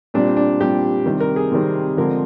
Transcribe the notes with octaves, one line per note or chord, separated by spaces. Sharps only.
A#2 G3 C4 D4
D4
A#2 G3 C4 G4
C3 D#3 G3 C4
A#4
G#4
C3 D#3 G3 C4
D3 F3 G#3 C4 A#4